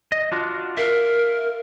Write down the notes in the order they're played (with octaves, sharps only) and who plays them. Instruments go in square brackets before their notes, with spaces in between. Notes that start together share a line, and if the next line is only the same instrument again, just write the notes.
[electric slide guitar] D#5
D4 F4 F#4
[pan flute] A#4 [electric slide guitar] E5 F5